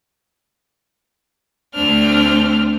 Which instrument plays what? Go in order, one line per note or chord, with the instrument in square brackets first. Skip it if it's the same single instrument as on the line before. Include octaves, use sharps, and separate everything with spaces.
[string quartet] D2 A3 C4 D4 F6